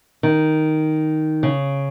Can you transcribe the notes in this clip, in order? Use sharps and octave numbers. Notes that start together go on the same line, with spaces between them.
D#3
C#3